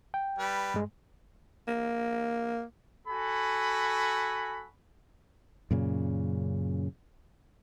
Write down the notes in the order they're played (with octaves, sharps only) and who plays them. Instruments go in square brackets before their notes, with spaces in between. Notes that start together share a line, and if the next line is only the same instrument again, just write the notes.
[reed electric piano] G5
[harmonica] G3 B4
[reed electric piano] G2 G#3
[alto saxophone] A#3
[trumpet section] F#4 A4 G#5 B5
[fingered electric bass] F#2 A#2 C#3